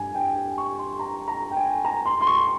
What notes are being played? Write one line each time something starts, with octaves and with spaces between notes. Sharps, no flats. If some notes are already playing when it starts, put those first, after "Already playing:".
Already playing: G2 G#5
G5
G#5
C#6
C6
A#5
A#5
G5
G#5
A#5
C6
C6
C#6